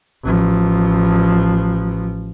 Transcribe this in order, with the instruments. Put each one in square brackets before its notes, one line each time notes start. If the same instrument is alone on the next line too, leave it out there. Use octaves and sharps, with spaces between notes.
[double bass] A1 F3